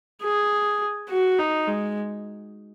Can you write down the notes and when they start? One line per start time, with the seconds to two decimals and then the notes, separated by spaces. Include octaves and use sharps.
0.22 G#4
1.09 F#4
1.39 D#4
1.68 G#3